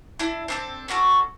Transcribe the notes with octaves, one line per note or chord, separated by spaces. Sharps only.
D4 E4
C4 D4 A4
C#4 D4 F#4 A4